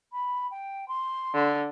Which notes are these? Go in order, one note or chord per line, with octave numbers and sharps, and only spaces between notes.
B5
G5
C6
D3